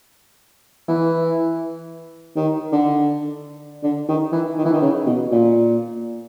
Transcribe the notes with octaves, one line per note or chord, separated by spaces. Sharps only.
E3
D#3
D3
D3
D#3
E3
D#3
E3
D#3
C#3
B2
A#2